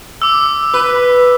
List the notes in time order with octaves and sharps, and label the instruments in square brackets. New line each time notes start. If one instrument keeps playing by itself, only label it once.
[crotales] D6 E6
[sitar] B4